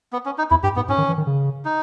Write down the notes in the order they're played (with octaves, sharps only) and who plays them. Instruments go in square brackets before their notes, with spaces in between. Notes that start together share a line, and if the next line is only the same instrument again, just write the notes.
[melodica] B3
C#4
D#4
[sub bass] E2 [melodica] E4
[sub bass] G2 [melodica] G4
[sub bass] G#2 [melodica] B3
[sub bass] G#2 [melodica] C#4
[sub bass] D#3
E3
D#3
C#3
[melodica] D#4